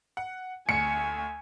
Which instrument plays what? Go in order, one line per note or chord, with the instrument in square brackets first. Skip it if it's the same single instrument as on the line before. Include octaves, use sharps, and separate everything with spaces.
[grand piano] F#5
[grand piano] D2 [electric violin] G#5 [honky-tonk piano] C#7